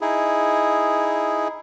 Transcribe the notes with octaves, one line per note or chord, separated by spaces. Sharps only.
D#4 E4 G#4